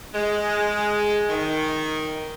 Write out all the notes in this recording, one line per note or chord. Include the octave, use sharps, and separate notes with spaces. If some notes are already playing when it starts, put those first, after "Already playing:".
G#3
D#3